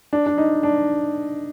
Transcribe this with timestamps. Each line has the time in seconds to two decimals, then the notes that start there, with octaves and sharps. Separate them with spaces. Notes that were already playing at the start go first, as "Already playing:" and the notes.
0.13 D4
0.26 D4
0.38 D#4
0.63 D4